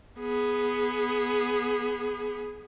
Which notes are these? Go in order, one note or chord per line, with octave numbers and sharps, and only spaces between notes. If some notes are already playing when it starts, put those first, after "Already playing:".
B3 G#4